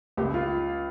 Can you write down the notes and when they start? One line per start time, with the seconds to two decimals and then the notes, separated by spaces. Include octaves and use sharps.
0.17 C#2 G4
0.34 F4